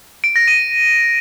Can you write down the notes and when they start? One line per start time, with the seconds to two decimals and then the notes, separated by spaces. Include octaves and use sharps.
0.24 D7
0.36 A#6
0.48 D#7